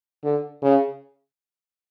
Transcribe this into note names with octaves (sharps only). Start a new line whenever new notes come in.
D3
C#3